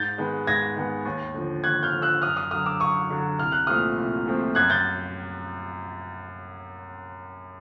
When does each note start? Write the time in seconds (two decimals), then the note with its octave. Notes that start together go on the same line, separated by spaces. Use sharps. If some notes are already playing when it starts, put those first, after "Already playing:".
Already playing: G#2 G6 A6
0.18 D#3 G#3 B3
0.47 G#2 G#6 A#6
0.76 D#3 G#3 B3
1.06 D#2
1.34 D3 F3
1.64 D#2 F#6 G#6
1.83 F6 G6
1.94 D3 F3
2.02 E6 F#6
2.22 F#2 D#6 F6
2.37 D#6 F6
2.51 D3 F#3 D#6 F6
2.66 D6 E6
2.80 F#2 C#6 D#6
3.10 D3 F#3
3.39 C2 F6
3.52 F#6
3.67 A#2 F3 A3 C4 D#6 F6
3.98 C2
4.26 A#2 F3 A3 C4
4.55 F#2 F#6 G#6
4.70 G6 A6